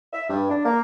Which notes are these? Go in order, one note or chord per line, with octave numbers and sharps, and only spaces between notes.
E5
G2
D4
A#3